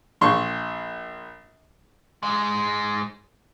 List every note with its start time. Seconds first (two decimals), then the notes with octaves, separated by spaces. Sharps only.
0.21 A#1 C6 C#6
2.23 G#2 G#3